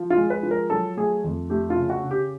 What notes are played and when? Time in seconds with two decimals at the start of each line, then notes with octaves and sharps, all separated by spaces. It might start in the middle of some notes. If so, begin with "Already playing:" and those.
Already playing: F3
0.10 F4
0.17 G#3
0.30 B4
0.43 F3
0.51 A#4
0.70 F#3 A4
0.97 A3 G#4
1.24 F2
1.50 A3 G4
1.70 F4
1.76 C#3
1.90 F#4
2.03 C#3
2.11 G4